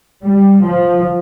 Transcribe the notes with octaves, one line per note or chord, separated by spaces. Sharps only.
G3
F3